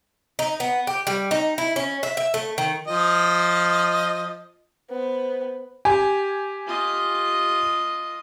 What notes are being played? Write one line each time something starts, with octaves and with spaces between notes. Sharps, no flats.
D#4
B3
G4
G3
D#4
E4
C#4
E5
E5
A3
D#3
F3 D#5
B3 C5
G4 G#5
F4 D#5